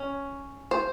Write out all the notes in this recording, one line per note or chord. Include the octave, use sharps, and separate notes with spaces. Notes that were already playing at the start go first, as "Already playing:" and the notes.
Already playing: C#4
C5